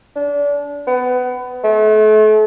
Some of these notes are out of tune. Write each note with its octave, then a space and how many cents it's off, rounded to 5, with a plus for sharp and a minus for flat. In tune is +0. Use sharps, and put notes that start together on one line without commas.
D4 -30
B3 +20
A3 -35